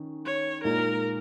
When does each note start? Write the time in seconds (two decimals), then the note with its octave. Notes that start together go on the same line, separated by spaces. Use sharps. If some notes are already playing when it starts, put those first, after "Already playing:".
Already playing: D#3 C#4
0.26 C#5
0.64 A#2 G#3 D#4 A#4